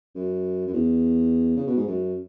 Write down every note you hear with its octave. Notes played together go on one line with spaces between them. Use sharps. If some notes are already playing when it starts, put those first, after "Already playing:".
F#2
F#2
E2
C#3
B2
G#2
F#2